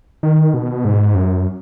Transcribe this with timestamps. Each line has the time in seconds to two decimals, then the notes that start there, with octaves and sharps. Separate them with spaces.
0.23 D#3
0.54 B2
0.85 G#2
1.15 F#2